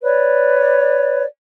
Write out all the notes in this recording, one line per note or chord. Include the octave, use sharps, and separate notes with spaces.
B4 C#5 D5